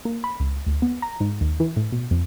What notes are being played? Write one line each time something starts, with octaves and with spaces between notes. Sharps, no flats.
A#3
B5
C#2
D2
B3
A#5
G#2
D#2
E3
A2
B2
F2